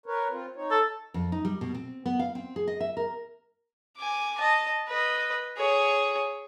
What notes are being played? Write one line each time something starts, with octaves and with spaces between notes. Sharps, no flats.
A#4 B4 C#5
C4 F4
D#4 C#5
A4
F2
D#4
G3
B2
C4
B3
F5
C4
G#4
D#5
E5
A#4
G#5 D6
D#5 A5
B4 D#5
G#4 C#5